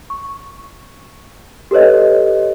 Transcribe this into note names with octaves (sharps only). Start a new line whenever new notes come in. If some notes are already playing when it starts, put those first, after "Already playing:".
C#6
G4 A4 B4 C#5 D#5